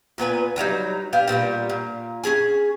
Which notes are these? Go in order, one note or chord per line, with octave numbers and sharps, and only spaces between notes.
A#2 B3 B4 G#5
D3 F#3 G3 D#4
B3 D4 G4 F5
A#2 G3 A#3 B3
A#2
C#4 G4 G#4 G#5